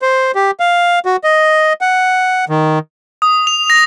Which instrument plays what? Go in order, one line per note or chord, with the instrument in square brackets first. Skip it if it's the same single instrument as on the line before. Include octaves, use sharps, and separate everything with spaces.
[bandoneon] C5
G4
F5
F#4
D#5
F#5
D#3
[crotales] D#6
F7
A#6